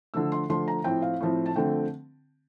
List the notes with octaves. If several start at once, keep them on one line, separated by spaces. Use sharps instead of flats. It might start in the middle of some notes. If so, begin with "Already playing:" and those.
D3 F3 A3 E6
C6
D3 F3 A3 C6
A#5
A2 F3 C4 G5
F5
A2 F3 C4
A5
D3 F3 A3 C4 G5